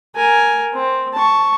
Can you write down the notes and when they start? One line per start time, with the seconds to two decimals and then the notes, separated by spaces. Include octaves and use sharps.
0.16 A#4 G#5
0.74 C4
1.14 A5 C#6